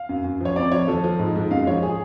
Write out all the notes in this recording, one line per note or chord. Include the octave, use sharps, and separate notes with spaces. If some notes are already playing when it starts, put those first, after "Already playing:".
Already playing: F5
F#2
F#2
F3 C#5
F2 D5
F3 C#5
F3 A4
F3
G#2
G#2
F#2 F5
F3 C#5
G#4